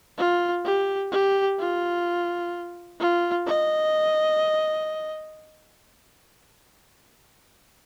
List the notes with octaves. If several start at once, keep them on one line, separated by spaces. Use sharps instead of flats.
F4
G4
G4
F4
F4
D#5